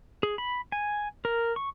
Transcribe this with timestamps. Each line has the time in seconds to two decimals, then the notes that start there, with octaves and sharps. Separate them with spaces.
0.23 G#4
0.38 B5
0.72 G#5
1.25 A#4
1.56 C#6